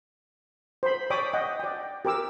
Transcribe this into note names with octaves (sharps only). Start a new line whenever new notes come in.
C5 B5
C#5 D5 G5 B5 D6 D#6
D#5 F#5 G5
D5 G5
G4 A#4 D6 E6